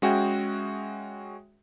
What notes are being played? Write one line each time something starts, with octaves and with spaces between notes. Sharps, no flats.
G#3 C#4 F#4 G#4 E5 G5